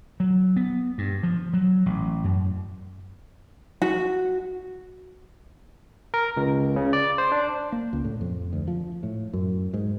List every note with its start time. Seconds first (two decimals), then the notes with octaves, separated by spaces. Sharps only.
0.20 F#3
0.56 B3
0.98 G2
1.23 F3
1.54 F#3
1.86 A1
2.24 F#2
3.82 F#4
6.14 A#4
6.37 C#2
6.76 C#3
6.93 D5
7.18 C5
7.32 D4
7.72 A#3
7.93 C#2
8.05 A2
8.21 F2
8.53 D2
8.68 F3
9.03 A2
9.33 F#2
9.74 G#2